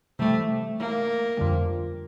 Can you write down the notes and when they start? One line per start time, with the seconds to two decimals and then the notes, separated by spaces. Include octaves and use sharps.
0.19 C3 E3 G3 A3
0.79 A#3
1.37 F2 D3 G3